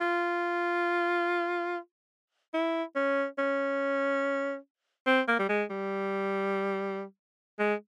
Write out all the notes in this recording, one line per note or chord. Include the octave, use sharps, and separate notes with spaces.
F4
E4
C#4
C#4
C4
A#3
G3
G#3
G3
G#3